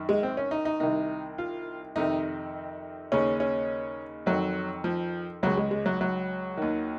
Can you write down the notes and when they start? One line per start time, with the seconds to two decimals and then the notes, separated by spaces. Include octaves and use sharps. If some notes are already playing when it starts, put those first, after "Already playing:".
Already playing: F#2 D#3
0.09 G#3
0.23 C4
0.37 C#4
0.51 D#4
0.65 D#4
0.80 C2 C3 D#3 D#4
1.38 F4
1.96 F2 C3 D#3 D#4
3.12 D#2 C#3 C#4
3.40 C#4
4.26 F2 D#3 F#3
4.84 F3
5.43 C#2 C#3 F#3
5.57 G#3
5.71 G#3
5.86 F#3
6.01 F#3
6.57 D#2 D#3